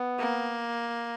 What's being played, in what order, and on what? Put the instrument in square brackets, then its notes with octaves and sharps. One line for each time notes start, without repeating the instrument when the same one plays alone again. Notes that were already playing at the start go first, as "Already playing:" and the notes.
Already playing: [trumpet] B3
[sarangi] A#3